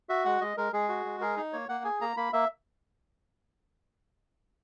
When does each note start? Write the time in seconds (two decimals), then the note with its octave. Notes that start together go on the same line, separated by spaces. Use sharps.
0.09 F#4 E5
0.25 G#3 F#5
0.41 G#3 D#5
0.57 G#3 A#4
0.73 G#3 G#4
0.89 F#4
1.05 G#3
1.21 G#4 A#4
1.37 D#4
1.53 A#3 C#5
1.69 A#3 F#5
1.84 G#4 G#5
2.01 A#3 A#5
2.17 A#3 B5
2.33 A#3 E5